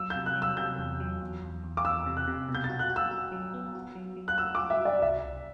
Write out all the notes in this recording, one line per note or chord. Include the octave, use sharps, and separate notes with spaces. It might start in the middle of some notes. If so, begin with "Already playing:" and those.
Already playing: F#3 E6
G6
C3
F#6
F#3
E6
C3 G6
E2
F#3
E2
E2
E2
D6
E2 E6
C3
F#6
C3
B2
G6
A6
F#4
F#6
F#4
E6
F#4
F#3
B3
F#4
F#3
F#3
F#6
F#4 E6
F#4 D6
E5
F#4 D5
C2 E5
C2